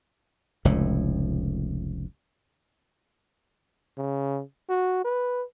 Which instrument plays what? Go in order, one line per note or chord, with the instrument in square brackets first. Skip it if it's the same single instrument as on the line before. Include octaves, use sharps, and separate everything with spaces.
[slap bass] F1 C#2 A2
[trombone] C#3
F#4
B4